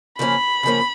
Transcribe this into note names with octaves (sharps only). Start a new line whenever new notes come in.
C#3 F3 A#3 C#4 B5
C#3 F3 A#3 C#4